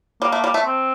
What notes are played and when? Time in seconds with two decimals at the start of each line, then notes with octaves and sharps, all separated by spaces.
0.22 G3 A#3
0.32 A3
0.44 G3
0.54 A3
0.66 C4